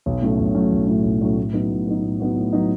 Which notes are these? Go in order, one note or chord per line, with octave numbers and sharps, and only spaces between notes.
B1
A2 F#3 A3 C#4
B1
A2 F#3 A3 C#4
B1
A2 F#3 A3 C#4
B1
A2 F#3 A3 C#4
A2
F#3 B3 D#4
A2
F#3 B3 D#4
A2
F#3 B3 D#4
A2
F#3 B3 D#4